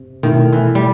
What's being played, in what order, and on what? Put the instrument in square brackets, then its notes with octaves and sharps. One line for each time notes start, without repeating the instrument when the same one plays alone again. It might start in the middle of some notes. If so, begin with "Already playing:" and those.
Already playing: [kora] C3
[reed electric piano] B2 A3 E4 A4 [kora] D#3
[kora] E3
G3